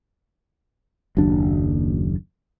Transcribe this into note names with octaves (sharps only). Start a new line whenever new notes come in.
F#1 D#2 F#3 D4